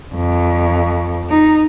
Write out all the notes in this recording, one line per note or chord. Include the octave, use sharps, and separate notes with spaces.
F2
D#4